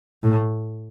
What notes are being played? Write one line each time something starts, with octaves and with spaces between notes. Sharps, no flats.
A2